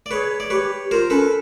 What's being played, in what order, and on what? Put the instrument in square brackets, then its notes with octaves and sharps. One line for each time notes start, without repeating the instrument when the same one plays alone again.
[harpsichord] D5
[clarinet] G#4 [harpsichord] B4 C#5
[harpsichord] D5
[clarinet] G4 [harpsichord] B4 C#5
[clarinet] F4 [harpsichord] A#4 C5
[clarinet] C#4 [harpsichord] A4 B4